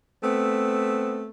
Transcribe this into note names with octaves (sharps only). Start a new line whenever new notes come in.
A3 B3 C4